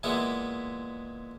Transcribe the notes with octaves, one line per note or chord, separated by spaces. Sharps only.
A#2 E3 G#3 A#3 B3 E4